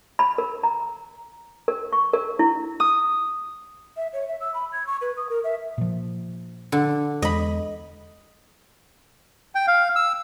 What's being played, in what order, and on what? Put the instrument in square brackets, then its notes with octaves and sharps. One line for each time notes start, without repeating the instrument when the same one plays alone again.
[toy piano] B5
A#4
A#5
A#4
C#6
A#4
E4
[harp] D#6
[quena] E5
C#5
E5
E6
B5
G#6
C#6
B4
D#6
A#4
E5
[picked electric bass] A#2 F3
[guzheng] D3
[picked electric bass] E2 G#3 [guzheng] D#5 B5
[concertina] G5
F5
E6